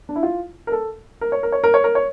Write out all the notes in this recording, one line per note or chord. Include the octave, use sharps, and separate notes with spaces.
D4
E4
F4
A#4
A4
A#4
C#5
A#4
C#5
A#4
C#5
A#4
C#5